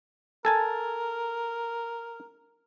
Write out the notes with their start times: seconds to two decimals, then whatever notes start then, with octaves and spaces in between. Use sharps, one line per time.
0.45 A4 A#4 G#5 A5